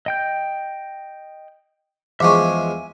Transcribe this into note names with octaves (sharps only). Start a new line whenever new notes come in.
D#5 G5 G6
E2 F3 G#3 E5 G#5 C#6 D6